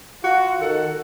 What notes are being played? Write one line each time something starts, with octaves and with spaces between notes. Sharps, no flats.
F4 F#4
D#3 A4 F#5